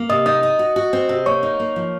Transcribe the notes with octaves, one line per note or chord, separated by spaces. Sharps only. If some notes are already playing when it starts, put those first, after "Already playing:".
Already playing: A#3
C3 D#5 D#6
D#4 D#5 D#6
D#4
F#4
F#4
C4
C3
A#3 C#5 C#6
D#4
A#3
F3